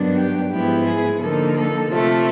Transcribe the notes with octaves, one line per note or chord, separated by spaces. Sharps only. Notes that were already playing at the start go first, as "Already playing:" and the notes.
Already playing: G2 D#3 F#3 B3 D4
G4
G#2 F3 G#3 B3 E4 G4
G#4
D3 F3 A#3 D#4 A4
A4
C3 F3 A3 A4